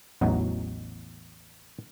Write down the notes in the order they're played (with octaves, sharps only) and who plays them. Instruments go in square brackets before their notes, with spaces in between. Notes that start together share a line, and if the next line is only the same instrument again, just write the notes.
[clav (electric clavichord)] A1 E2 F#3 D#4 F#4